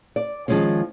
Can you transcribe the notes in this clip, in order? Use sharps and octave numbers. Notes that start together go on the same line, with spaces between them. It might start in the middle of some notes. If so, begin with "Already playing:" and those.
D5
D#3 F3 G#3 C4 C#4